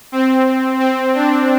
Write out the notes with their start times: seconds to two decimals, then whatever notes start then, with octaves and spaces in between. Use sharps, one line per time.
0.12 C4
0.80 C4
1.15 D4